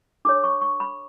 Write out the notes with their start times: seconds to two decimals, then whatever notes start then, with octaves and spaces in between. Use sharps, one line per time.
0.25 D4 A4 C#5 D6
0.44 C#6
0.61 C#6
0.80 B5